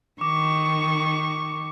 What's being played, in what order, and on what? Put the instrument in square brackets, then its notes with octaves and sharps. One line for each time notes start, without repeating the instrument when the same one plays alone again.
[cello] D#3 [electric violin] C#6 [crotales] D6